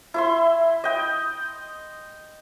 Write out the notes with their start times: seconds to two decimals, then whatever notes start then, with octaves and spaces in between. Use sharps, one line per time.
0.14 E4 E5 C6
0.84 D#5 G5